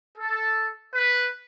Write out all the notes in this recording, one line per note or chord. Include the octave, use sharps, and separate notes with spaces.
A4
B4